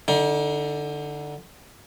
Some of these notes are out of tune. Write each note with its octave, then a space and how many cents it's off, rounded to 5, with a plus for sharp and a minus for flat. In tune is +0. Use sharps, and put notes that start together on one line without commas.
D3 +5 D#4 +40